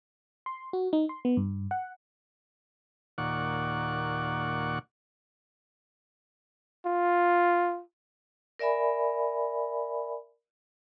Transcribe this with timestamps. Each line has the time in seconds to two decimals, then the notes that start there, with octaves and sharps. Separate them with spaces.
0.46 C6
0.73 F#4
0.93 D#4
1.09 C6
1.25 B3
1.37 G2
1.71 F#5
3.18 D#2 A#2 D5 F#5 C#6
6.86 F4
8.59 A#4 D5 E5 G#5 B5